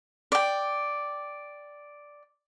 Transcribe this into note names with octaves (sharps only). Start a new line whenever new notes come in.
D5 G5